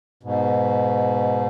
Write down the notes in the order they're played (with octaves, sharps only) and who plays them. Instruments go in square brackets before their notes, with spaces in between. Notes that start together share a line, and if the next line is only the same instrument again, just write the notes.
[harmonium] G#2 B2